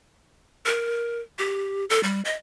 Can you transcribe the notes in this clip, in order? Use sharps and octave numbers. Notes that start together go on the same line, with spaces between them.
A#4
G4
A4
G3
D#5